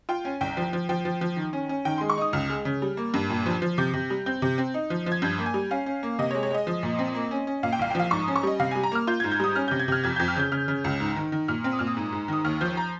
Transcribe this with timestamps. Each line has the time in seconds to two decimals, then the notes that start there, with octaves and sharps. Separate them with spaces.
0.09 F4 G5
0.25 C#4 G#5
0.41 C2 G5
0.57 F3
0.73 F3
0.89 F3 G5
1.05 F3
1.21 F3
1.37 D#3
1.53 C#4
1.69 C#4
1.85 D#3 G5
1.98 G#3 C6
2.10 C#6
2.18 D#4 D#6
2.33 C#2 F6
2.50 G#3
2.65 C#3
2.82 G3
2.97 A#3
3.14 G2
3.30 A#2
3.46 F3
3.62 F3
3.78 C3 G6
3.94 C3
4.10 G3
4.26 C4 G6
4.42 C3
4.58 C4
4.74 D#4
4.90 F3
5.06 F3
5.12 G#6
5.22 G2 G6
5.39 A#3
5.46 G#5
5.54 G3
5.71 C#4 F5
5.86 C#4
6.03 A#3
6.19 C3 D#5
6.31 C#5
6.35 G#3
6.43 C#5
6.50 G#3 D#5
6.67 F3
6.83 A#2
6.99 C4
7.15 A#3
7.31 C#4
7.47 C#4
7.63 A#2 F5
7.73 G5
7.79 C2 F5
7.90 G5
7.95 F3 F5
8.11 G#2 C#6
8.23 C#4 D#6
8.36 C#6
8.43 G3 D#5
8.60 C3 F5
8.71 G3 G#5
8.83 A#5
8.92 A#3 F6
9.07 F4 G6
9.20 G#2 G#6
9.32 G6
9.40 G3 D#6
9.56 C#4 F6
9.68 C3 G6
9.80 G#6
9.88 C3 F6
10.04 F2 G#6
10.16 F2 G6
10.28 F6
10.36 C#3 G6
10.52 C#3 F6
10.68 C#3
10.84 C#2
11.00 G#2
11.16 D#3
11.32 D#3
11.48 A#2 F6
11.64 C4
11.72 D#6
11.79 A#2 F6
11.87 D#6
11.97 G#2
12.12 G#2
12.28 D#3 D#6
12.45 D#2 F6
12.61 F3 G6
12.77 A#5